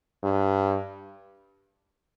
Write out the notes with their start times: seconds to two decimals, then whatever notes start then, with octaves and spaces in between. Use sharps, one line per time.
0.24 G2